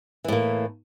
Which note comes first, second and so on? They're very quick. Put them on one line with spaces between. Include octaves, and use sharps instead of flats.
E3 A2 A#3